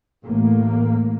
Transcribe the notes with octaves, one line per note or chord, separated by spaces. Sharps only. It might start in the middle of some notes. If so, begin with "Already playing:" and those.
A1 A2 A#3